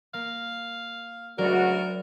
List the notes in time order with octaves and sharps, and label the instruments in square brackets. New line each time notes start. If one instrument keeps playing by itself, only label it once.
[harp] A#3 [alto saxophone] F5
[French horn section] D2 C#3 F#4 [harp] F#3 G#3 B5 [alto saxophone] A#4 [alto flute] D5